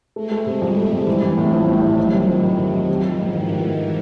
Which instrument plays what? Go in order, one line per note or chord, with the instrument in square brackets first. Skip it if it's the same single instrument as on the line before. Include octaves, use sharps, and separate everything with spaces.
[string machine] G#3 [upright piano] A3
[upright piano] A3
C3
[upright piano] F2 [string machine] G3
[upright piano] A3
C3
E3
E3
A2
A#1
A2
A2
[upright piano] D#3 [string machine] F#3
[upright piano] C3
F2
D#3
C3
D#3
[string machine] F3 [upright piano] G3
[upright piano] G3
G#2
[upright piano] D#3 [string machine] E3
[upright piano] D#3
G#2